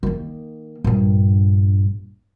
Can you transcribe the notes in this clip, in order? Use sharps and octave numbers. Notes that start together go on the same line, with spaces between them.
D#3 A#3
A#1 G2